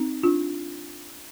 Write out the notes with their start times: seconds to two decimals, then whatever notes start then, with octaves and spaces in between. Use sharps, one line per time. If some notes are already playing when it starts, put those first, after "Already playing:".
Already playing: C4 D#4
0.23 D4 F4